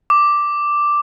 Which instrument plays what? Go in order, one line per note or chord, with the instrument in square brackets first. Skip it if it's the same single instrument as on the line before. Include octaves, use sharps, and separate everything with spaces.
[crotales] D6